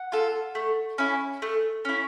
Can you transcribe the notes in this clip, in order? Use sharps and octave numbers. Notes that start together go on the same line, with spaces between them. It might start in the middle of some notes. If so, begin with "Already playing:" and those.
Already playing: F#5
F4 A4
A3
C#4 E4
A3
C#4 E4